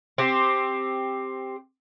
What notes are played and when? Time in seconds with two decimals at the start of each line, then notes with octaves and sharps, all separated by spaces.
0.18 C4 G4